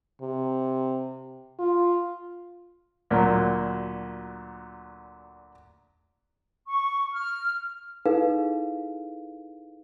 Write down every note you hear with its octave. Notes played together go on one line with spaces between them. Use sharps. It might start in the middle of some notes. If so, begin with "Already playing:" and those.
C3
F4
D2 A#2 F#3 A#4
C#6
F6
D#4 E4 G#4 A4 B4 F5